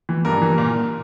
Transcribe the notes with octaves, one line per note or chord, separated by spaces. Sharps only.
E3
G2 A#4
E3
A#2